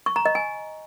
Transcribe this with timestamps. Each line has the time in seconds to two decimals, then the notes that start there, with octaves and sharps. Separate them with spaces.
0.06 C#6
0.16 A#5
0.25 D#5
0.35 G#5